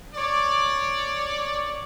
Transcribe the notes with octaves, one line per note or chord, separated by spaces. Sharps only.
C#5 D5